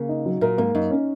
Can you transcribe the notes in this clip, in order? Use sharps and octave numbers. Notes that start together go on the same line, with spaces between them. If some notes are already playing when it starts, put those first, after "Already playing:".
Already playing: C#3 A#3
D#4
F#3
A#2 A#4
G#2 A#3
F#2 D#4
C#4